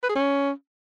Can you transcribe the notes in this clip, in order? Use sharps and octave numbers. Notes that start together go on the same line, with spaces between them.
B4
G#4
C#4